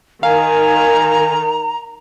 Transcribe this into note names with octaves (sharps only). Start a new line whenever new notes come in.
D#3 F5 G#5 A#5